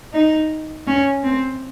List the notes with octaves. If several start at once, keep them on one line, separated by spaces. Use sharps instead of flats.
D#4
C#4
C4